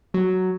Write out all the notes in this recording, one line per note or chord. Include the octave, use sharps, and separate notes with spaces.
F#3